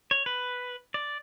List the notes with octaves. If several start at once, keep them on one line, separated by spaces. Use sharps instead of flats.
C#5
B4
D5